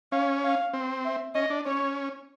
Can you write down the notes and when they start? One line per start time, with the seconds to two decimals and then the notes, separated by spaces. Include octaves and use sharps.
0.12 C#4 F5
0.44 F5
0.73 C4
1.05 E5
1.35 C#4 D#5
1.50 D4
1.66 C#4 C#5